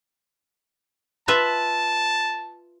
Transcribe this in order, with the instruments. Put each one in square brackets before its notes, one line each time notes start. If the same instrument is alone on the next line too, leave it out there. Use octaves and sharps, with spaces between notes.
[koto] F4 B4 E5 [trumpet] A5